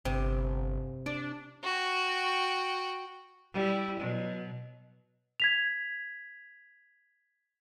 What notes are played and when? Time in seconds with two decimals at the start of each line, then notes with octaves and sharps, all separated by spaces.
0.05 G1 C3
1.06 D4 D5
1.64 F#4 G5
3.53 G3 E4
4.00 B2 F#3
5.40 G#6 B6 F7